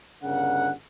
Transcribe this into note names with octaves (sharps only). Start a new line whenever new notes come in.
G1 C#3 D4 A#4 F#5